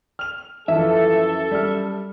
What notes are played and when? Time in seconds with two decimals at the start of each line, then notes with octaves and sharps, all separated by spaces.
0.19 F6 F7
0.68 F#2 E3 F3 A4 E5
1.51 G3 F6